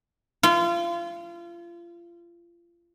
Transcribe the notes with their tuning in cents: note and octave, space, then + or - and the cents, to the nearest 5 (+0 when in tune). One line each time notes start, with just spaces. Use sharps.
F4 -30